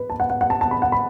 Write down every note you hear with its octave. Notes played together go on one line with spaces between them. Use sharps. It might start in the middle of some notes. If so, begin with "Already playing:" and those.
Already playing: B4
A5
F#5
F#5
F#5
A5
A5
B5
F#5
B5